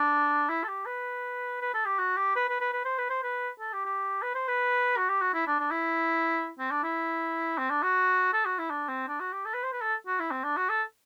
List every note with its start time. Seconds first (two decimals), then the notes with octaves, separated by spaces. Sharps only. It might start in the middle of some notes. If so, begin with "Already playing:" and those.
Already playing: D4
0.49 E4
0.63 A4
0.68 G4
0.86 B4
1.61 B4
1.74 A4
1.85 G4
1.98 F#4
2.17 G4
2.36 B4
2.49 B4
2.60 B4
2.73 B4
2.85 C5
2.98 B4
3.10 C5
3.23 B4
3.60 A4
3.73 G4
3.85 G4
4.22 B4
4.35 C5
4.48 B4
4.97 F#4
5.09 G4
5.21 F#4
5.34 E4
5.47 D4
5.59 D4
5.71 E4
6.59 C4
6.71 D4
6.83 E4
7.58 C4
7.70 D4
7.83 F#4
8.33 A4
8.45 F#4
8.58 E4
8.70 D4
8.88 C4
9.08 D4
9.20 F#4
9.33 G4
9.45 A4
9.54 B4
9.64 C5
9.72 B4
9.81 A4
10.07 F#4
10.19 E4
10.31 C4
10.44 D4
10.57 F#4
10.69 A4